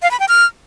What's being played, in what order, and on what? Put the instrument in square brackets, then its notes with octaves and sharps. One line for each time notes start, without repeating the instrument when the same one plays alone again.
[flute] F5
B5
G5
F6